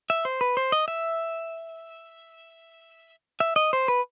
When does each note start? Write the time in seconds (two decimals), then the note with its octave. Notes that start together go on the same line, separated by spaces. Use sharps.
0.10 E5
0.25 C5
0.41 B4
0.57 C5
0.72 D#5
0.88 E5
3.40 E5
3.56 D#5
3.73 C5
3.88 B4